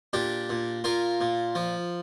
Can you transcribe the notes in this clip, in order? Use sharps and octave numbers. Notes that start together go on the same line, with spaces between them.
A#2 D4 G4
A#2
A#2 F4 A#4
A#2
F3